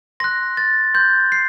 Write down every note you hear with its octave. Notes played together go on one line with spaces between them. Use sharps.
C6 F#6 A#6
A6
C6 F#6 G6
C7